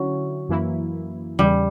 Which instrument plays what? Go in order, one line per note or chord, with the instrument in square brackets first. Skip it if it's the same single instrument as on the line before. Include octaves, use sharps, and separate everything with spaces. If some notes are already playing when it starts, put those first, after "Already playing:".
Already playing: [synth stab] D3 C#4 E4 [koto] F#3
[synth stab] F#2 E3 A#3 E4
[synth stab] E2 C#3 E3 [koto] G3